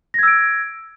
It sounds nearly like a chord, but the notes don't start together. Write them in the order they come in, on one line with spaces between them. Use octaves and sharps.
A#6 G#6 E6 D7